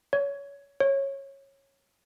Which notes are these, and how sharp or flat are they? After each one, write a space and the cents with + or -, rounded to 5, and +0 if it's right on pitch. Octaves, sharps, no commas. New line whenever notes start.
C#5 +25
C#5 -15